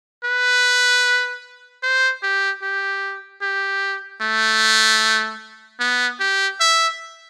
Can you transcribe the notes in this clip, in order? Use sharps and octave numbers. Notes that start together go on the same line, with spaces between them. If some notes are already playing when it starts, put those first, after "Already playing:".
B4
C5
G4
G4
G4
A3
B3
G4
E5